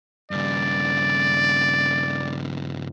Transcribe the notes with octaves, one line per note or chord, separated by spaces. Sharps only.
G2 C#3 D5